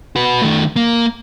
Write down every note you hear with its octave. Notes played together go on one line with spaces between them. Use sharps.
F#4 B4
D#3 A3
A#3